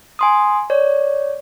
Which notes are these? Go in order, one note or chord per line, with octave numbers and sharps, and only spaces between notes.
G#5 C6 D#6
C#5 D5